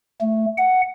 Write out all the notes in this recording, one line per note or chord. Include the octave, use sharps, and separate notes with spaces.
A3
F#5